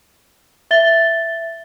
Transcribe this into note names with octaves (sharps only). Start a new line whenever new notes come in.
E5 A6 G7